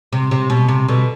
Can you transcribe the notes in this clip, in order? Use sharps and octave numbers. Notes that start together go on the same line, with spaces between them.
C3
C3
B2
C3
B2 D3